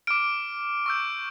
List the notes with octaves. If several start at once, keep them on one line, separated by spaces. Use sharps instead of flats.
D6 F6 D7
C#6 E6 G6